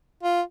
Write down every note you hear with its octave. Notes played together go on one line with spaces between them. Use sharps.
F4